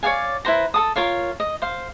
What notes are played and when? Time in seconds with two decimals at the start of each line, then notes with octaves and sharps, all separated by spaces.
0.03 C#5 D5 F5 G#5
0.45 E4 B4 C5 A#5
0.74 A4 A5 D#6
0.96 F4 A#4 C#5 F5
1.40 D#5
1.62 C5 F5